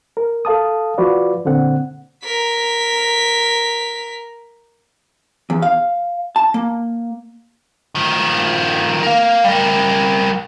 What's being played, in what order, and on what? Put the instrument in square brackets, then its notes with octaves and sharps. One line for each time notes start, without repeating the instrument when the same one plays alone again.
[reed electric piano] A#4
A4 F5 A5 D#6
F3 F4 F#4 B4 D5
A#2 D3 C4 F#5
[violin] A#4 B6
[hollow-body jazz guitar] E2
F5
A5
A#3
[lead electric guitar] D#3 F3
A#4 F5
G3 A#4